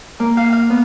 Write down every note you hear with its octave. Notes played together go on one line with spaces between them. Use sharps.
A#3
F5
F5
B3